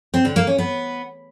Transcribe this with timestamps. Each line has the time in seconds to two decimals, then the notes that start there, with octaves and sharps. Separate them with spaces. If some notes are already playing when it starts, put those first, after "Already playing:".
0.14 C4
0.25 D3
0.36 A#3
0.47 C#4
0.58 B3